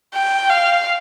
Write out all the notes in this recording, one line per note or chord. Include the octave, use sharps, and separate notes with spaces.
G5
F5